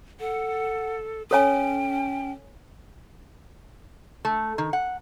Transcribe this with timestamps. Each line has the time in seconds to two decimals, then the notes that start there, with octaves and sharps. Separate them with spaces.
0.20 A4 F#5
1.31 C#4 A4 C#5 G5 G#5
4.25 A3
4.58 D#3
4.73 F#5